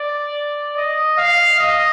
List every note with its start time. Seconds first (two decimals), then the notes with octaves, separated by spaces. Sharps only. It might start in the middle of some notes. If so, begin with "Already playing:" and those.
Already playing: D5
0.77 D#5
1.18 F5
1.59 D#5